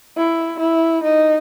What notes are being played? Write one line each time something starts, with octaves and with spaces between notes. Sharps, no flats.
E4
E4
D#4